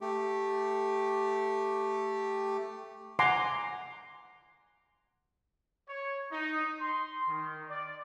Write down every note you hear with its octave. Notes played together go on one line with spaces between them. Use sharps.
A3 G4
F#5 G#5 A#5 C6 D6
C#5
D#4
C6
D#3
D5